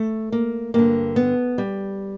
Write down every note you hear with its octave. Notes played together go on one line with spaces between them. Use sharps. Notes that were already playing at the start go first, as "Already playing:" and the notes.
Already playing: A3
A#3
G2 D3 A#3
B3
G3